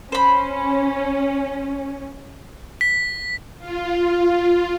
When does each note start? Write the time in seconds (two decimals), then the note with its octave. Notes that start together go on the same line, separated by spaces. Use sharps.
0.12 C#4 C5 B5
2.81 B6
3.59 F4